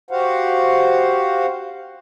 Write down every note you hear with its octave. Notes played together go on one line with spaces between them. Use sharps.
F#4 G4 C5 F5 F#5